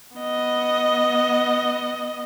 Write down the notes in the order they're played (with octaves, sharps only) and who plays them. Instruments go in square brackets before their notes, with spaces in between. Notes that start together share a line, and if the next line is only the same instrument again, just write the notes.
[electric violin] B3 D#5